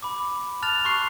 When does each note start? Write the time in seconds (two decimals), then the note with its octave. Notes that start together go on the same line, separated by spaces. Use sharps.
0.03 B5 D6
0.62 A5 F6 F#6 A6 F7
0.85 C6 C#6 F#6 C7